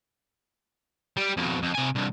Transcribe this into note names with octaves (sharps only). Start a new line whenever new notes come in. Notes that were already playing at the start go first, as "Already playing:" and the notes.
G3
F2 B2
F2
C3 G#5
C2 G2